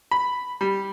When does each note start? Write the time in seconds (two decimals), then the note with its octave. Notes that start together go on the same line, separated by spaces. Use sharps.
0.11 B5
0.61 G3